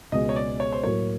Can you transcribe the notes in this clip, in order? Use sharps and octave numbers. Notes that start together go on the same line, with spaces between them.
C#2 B2 G#3 D#5
C#5
D5
C#5
C5
A2 F#3 A#3 C#5